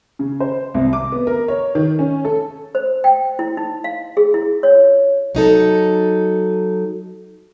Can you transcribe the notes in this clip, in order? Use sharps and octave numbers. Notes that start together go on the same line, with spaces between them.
C#3
C5
C2
D6
B3
A#4
C#5
D#3
C#4
A4
C5
G5
E4
D#4
F5
G#4
E4
C#5
F#3 D#4 A4